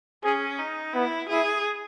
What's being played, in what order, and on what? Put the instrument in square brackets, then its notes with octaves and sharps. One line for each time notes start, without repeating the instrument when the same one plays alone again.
[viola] C#4 [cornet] G#4
[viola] D#4
[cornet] B3 [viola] E4
[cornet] E4 [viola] G#4